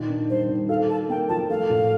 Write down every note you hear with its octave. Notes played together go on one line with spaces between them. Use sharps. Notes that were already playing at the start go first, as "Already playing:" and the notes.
Already playing: A#2 D#3
D4
G3 C5
D#3
A4 F5
A4 A5
A#3 G5
F3 A5
A3 F5
A2